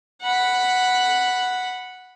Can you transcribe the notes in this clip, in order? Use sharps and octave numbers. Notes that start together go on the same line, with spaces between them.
F#5 B5